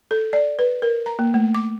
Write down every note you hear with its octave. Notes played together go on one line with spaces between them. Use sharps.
A4
D5
B4
A#4
A#5
A#3
A3
D6